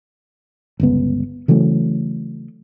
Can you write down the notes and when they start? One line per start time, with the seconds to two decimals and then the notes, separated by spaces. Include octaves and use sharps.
0.80 G1 C#2 B3
1.48 C#3 E3 F#3 A3